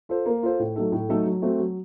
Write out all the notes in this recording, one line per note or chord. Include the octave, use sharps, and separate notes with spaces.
F4 A4 C5
A#3
F4 A4 C5
A2
F#3 A3 D#4 A4
A2
F#3 A3 D#4 A4
F#3
A3 C4 F#4
F#3